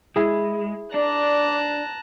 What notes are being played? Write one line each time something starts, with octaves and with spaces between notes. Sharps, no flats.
G#3 E4 G#4
D4 D5 A5 A#5 F#6